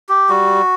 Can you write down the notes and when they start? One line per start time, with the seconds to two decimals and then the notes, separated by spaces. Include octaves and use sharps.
0.09 G4
0.29 G3 F#4